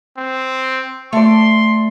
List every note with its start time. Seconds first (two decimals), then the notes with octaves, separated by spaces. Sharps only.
0.17 C4
1.13 A3 D5 C6